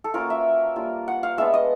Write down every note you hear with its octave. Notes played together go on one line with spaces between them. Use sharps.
A4
F#3 A#3 C#4 F4 A#4
E5
G3 A#3 D4 F4
F#5
F5
G#3 B3 D4 F4 E5
D#5